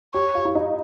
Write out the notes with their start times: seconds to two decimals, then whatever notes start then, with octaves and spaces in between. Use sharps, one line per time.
0.14 G4 C#5
0.35 F4
0.45 E4
0.55 D#4